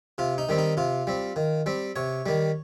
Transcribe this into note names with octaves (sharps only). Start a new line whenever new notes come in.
C3 F4
D#4
D#3 G3 C4
D#4
C3 F4
G3 C4
D#3
G3 C4
C3 C#5
D#3 G3